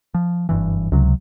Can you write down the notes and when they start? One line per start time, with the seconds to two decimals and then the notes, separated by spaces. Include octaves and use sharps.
0.14 F3
0.49 F#1 G2 E3
0.92 C#2 C3 F#3